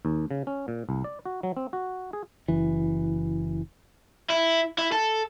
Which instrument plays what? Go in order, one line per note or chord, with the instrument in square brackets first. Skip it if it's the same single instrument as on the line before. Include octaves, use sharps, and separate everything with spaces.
[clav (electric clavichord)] D#2
C#3
C#4
A#2
C2
D5
F#4
F#3
C4
F#4
G#4
[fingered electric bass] F#1 E3
[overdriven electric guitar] E4
E4
A4